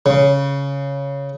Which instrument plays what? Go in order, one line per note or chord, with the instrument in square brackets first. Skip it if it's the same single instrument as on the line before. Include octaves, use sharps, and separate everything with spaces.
[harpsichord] C#3